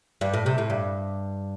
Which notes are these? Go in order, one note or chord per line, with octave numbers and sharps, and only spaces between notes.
G2
A2
C3
A2
G2